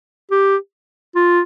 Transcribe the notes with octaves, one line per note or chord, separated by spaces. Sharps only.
G4
F4